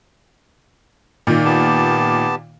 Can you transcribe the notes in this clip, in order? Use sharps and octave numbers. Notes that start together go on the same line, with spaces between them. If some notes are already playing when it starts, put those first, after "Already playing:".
A#2 D#3
B3 G4 A5